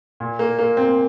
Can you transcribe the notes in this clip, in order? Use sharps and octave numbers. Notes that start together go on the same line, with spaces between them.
A#2
A#3
A#3
C4